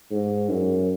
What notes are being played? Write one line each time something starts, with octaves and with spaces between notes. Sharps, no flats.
G#2
F#2